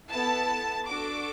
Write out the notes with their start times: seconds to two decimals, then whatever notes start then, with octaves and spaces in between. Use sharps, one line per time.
0.10 B3 E4 A4 A5
0.87 D4 F#4 A4 D6